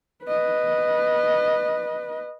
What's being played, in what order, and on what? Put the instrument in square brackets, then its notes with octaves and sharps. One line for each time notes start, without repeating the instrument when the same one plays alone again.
[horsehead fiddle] B4 D#5